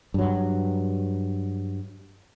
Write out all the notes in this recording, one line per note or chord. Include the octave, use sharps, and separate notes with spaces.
G2 F#3